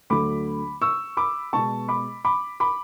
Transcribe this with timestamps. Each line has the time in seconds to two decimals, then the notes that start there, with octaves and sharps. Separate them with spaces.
0.10 D2 D3 F#3 A3 B5 D6
0.81 C#6 E6
1.17 B5 D6
1.53 B2 G#3 B3 A5 C#6
1.88 B5 D6
2.25 B5 D6
2.60 B5 D6